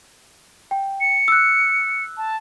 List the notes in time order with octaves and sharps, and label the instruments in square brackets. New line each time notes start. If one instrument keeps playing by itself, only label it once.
[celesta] G5
[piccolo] C#7
[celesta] E6 F#6
[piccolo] A5